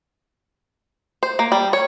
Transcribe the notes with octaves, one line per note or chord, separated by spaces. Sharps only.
C5
A#3
G3
C#5